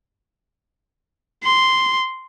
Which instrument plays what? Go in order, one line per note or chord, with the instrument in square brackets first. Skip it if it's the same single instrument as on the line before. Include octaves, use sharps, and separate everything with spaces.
[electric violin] C6